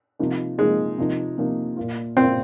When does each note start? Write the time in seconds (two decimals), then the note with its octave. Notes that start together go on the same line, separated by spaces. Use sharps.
0.19 C3 F3 A#3 D#4
0.58 C3 F3 G#3 A#3 D#4
0.98 C3 F3 A#3 D#4
1.38 C3 F3 A#3 D#4
1.77 A#2 A#3 F4
2.17 A#2 A#3 C4 F4